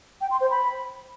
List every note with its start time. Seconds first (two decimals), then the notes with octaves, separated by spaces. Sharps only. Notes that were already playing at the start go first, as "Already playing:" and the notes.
0.21 G5
0.31 C6
0.41 C5
0.50 B5